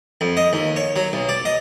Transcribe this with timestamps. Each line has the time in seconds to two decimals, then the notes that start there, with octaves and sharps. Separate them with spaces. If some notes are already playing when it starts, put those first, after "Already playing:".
0.21 F2
0.37 D#5
0.53 D#2
0.76 C#5
0.96 F#3
1.13 B1
1.29 D5
1.45 D#5